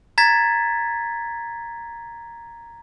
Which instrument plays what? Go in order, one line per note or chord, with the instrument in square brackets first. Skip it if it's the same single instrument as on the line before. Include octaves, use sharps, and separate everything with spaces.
[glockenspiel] A#5 G#6 A6 B6